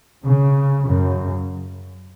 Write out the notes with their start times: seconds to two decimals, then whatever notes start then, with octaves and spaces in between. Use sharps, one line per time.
0.24 C#3
0.85 F#2 C#3